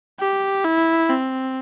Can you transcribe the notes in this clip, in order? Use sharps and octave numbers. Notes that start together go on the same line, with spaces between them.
G4
E4
C4